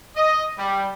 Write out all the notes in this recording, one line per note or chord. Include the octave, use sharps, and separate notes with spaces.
D#5
G3